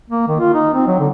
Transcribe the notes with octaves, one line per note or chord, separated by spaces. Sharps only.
A#3
D#3
F4
D#4
C4
F#3
D3